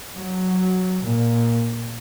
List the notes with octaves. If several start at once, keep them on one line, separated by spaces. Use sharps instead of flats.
F#3
A#2